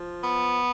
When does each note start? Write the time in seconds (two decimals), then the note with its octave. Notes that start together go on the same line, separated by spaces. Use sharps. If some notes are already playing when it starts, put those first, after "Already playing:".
Already playing: F3
0.24 B3